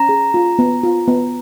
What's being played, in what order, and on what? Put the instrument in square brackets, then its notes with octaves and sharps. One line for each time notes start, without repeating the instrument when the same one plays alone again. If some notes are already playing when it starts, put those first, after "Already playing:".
Already playing: [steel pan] C#4 [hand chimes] A#5
[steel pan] G#4
F4
B3
F4
B3